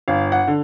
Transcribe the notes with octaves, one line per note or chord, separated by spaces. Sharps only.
G1 F5
F#5
D3